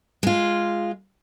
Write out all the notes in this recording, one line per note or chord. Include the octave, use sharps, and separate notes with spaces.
G#3 F4